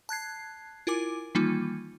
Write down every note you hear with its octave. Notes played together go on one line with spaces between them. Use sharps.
A5 F#6 G#6 C7
E4 F4 A#4 G#5 D6
D#3 E3 G3 A#3 D#4 F4